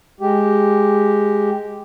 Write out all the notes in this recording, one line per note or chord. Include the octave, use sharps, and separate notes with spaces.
G#3 G4